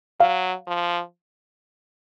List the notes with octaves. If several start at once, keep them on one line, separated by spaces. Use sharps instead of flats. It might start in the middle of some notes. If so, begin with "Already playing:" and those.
F#3 F5
F3